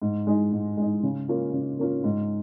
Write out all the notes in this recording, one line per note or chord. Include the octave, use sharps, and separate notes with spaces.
G#2
G#3 D#4
G#2
G#3 D#4
C#3
A#3 C#4 F4
C#3
A#3 C#4 F4
G#2